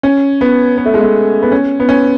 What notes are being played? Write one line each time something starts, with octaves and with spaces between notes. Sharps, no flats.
C#4
B3
B3
A3
G#3
A3
B3
C#4
B3
C#4